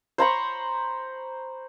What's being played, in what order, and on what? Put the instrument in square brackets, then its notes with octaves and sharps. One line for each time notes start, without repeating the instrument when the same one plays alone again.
[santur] C5 A#5 B5 C#6